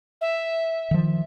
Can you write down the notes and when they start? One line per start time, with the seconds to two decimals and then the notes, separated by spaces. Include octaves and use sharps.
0.21 E5
0.91 D#3 F3